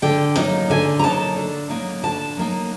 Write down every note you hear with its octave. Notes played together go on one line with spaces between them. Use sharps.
D3 G5
F#3 A#3 D#4
D3 G#5
A#5
F#3 A#3 D#4 A5
D3
F#3 A#3 D#4
D3 A5
F#3 A#3 D#4